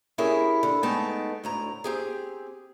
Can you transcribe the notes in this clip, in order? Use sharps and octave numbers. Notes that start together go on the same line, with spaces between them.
C#4 E4 G4 G#4 A#4
D3
G#3 A3 B3 D#4 G5 A5
D2 A2 A#5
C4 G4 G#4